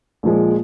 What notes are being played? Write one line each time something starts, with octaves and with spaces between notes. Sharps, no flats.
A#1 A#2 F3 G#3